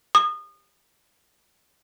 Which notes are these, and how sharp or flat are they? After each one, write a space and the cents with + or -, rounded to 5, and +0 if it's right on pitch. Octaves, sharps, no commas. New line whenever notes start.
D#6 -30